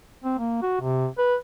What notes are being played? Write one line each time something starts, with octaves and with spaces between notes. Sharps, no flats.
C4
A#3
F#4
C3
B4